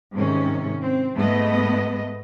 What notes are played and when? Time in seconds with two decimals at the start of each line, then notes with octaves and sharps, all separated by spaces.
0.14 G#2 C3 D#3 C#4
0.81 C4
1.15 G#2 G#3 A3 B3 B4 D#5